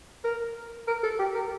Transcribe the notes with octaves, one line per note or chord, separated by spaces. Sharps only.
A#4
A#4
A4
G4
A#4